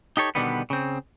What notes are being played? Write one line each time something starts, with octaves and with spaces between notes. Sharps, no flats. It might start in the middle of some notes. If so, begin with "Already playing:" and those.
D#4 G4 A4 C#5
B2 D3 D#3 G3 B3
C#3 C4